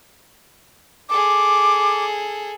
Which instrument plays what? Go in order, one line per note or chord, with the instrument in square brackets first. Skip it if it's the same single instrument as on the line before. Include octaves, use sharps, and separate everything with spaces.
[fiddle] G#4 A4 [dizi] D6